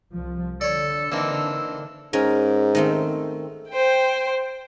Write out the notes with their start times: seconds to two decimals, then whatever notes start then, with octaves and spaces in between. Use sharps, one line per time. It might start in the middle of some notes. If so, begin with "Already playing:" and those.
0.13 C2 F3
0.61 D3 A4 C#5 D5
1.12 E3 A#3 C4 D4 D#4 E6
2.13 G#2 C#4 A#4
2.75 D#3 A3 C4
3.69 C5 G5